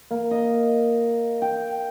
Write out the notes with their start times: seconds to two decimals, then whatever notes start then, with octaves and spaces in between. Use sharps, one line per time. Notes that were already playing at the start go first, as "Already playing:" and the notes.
0.11 A#3
0.31 D#5
1.42 G5